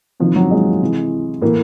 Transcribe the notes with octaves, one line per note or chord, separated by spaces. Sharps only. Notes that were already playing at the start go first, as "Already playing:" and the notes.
C3 D#3 F3
F#3
G#3
C3 E3
A2 E3 A#3